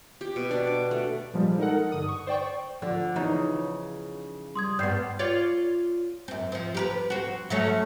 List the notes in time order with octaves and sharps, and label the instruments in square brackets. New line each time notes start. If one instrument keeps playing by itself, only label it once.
[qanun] G4
B2
D4
D6
A3
[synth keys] A#2 F3 G3 G#3
D#4 A4 A#4 F#5
G2 D3 D#6
C#6
C5 D5 G5 C#6
[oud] D3 [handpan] F3 D5
[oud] C#3 D#4 [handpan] E3 B3
[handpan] G3 [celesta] C6 D#6 G#6
[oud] G2 B3 [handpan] D5 [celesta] G6 C7
[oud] F4 C#5 D5
F#2 C4
F3 C4
G4 A#4 B4
C4 F#4
F#3 A3 C#4